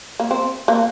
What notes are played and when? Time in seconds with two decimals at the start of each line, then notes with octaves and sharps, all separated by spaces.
0.20 A#3
0.31 C4
0.68 A#3